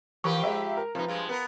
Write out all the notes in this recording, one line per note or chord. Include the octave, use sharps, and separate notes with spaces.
E3 F3 G4 A#4 B4 C#6
G#3 E5 A#5
A#4
C3 F3 D#4 B4
G2 G#3 F4
B3 A#4